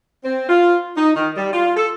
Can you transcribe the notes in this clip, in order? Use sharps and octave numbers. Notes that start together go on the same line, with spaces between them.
C4
F4
D#4
D#3
G3
F4
A4